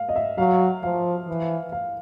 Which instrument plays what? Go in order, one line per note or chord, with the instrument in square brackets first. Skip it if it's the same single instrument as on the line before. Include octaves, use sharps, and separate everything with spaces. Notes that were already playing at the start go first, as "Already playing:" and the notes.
Already playing: [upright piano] F5
D#5
E5
[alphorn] F#3 [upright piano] F5
[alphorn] F3 [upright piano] F5
[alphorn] E3
[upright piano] F5